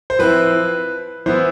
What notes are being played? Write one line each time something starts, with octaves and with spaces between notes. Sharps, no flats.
C5
F3 C4 E4 B4
E3 B3 E4 C5